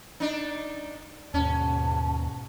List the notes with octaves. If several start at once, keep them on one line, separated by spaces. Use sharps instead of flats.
D4 D#4
D#2 G#2 B2 C#4 A5